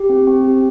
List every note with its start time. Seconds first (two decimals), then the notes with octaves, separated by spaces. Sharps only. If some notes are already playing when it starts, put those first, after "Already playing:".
Already playing: G4
0.09 C4
0.27 C4
0.44 G4